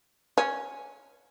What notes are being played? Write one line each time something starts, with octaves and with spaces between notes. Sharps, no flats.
C#4